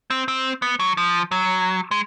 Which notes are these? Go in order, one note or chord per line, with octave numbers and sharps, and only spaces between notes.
C4
C4
B3
F#3
F3
F#3
G#3